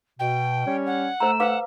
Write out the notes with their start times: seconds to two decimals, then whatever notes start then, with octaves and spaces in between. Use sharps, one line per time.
0.19 B2 G5
0.66 G3 C#4 C#5
0.86 F#5
1.20 A3 C5 A#5 E6
1.40 B4 F5 F#5 D6